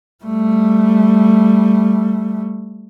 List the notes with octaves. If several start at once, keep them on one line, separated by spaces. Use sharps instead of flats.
G3 A3